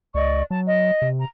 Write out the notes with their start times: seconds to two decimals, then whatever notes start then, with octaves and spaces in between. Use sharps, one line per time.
0.14 C#2 D5 D#5 C#6
0.50 F#3 A5
0.65 D#5
1.02 C3
1.19 A#5